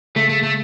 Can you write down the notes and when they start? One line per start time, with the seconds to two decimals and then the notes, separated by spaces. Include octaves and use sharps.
0.16 C#3 A3
0.29 A3
0.43 A3